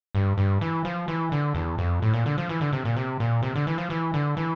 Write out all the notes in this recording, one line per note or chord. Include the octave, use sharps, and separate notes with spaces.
G2
G2
E3
F3
E3
D3
E2
F2
A2
A#2
D3
F3
E3
D3
C3
A#2
C3
A#2
C3
D3
E3
F3
E3
D3
E3